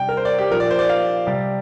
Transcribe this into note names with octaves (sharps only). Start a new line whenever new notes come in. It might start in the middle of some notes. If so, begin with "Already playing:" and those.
Already playing: C3 G3 G5
A#4
C5
D5
G4
A#2 F3 A#4
D5
C5
D5
F5
C3 G3